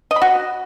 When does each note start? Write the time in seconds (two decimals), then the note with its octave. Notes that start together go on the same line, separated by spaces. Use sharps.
0.11 D#5
0.16 B5
0.22 F#4